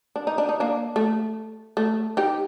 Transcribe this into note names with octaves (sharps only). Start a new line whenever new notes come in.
D4
D#4
D4
D#4
A#3 D4
A3
A3
D#4 G4